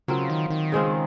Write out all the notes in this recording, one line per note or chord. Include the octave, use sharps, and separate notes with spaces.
C#3 F#3 C4 F4 A#4
D#3
D#3
C#3 G#3 C4 F4